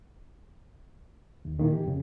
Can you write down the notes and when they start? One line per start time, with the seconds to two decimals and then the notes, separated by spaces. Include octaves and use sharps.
1.45 D#2
1.59 A#2 D#3 E3 A#3
1.73 G4
1.85 F2 C#3